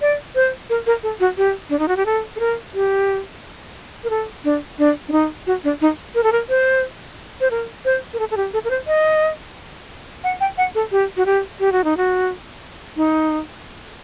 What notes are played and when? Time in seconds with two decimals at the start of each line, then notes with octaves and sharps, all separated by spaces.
0.01 D5
0.35 C5
0.70 A#4
0.87 A#4
1.03 A4
1.20 F#4
1.37 G4
1.70 D4
1.79 D#4
1.88 F#4
1.97 G4
2.06 A4
2.36 A4
2.40 A#4
2.74 G4
4.04 A#4
4.10 A4
4.44 D4
4.78 D4
5.08 D4
5.12 D#4
5.47 F#4
5.64 D4
5.81 D#4
6.15 A#4
6.24 A4
6.32 A#4
6.49 C5
7.41 C5
7.51 A#4
7.85 C5
8.14 A#4
8.19 A4
8.31 A4
8.37 G4
8.53 A4
8.65 A#4
8.71 C5
8.87 D#5
10.24 F#5
10.40 G5
10.58 F#5
10.75 A4
10.92 G4
11.17 F#4
11.26 G4
11.60 G4
11.72 F#4
11.84 D#4
11.97 F#4
12.97 D#4